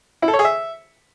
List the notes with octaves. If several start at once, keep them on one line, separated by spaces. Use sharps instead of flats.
E4
A4
C#5
G#4
E5